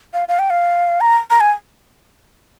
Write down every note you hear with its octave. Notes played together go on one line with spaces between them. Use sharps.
F5
F5
G5
F5
A#5
A#5
G#5